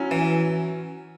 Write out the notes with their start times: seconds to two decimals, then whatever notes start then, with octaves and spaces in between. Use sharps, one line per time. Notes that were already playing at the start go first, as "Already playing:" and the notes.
Already playing: F#3 C#4 E4
0.11 E3